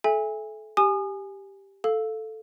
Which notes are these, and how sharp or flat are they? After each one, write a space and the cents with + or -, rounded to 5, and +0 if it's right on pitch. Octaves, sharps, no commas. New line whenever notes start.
A4 -30 E5 +0 G#5 -25
G4 +0 G#5 +0 D#6 -35
A4 +0 F5 +0